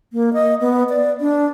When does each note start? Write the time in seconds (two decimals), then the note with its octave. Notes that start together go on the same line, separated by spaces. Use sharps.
0.13 A#3
0.33 D#5
0.61 B3
0.89 D5
1.20 D4